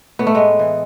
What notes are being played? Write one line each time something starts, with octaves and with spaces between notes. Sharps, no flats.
A2 B3
A3
G#3 B3
E3